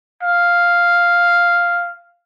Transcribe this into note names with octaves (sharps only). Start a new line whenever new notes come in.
F5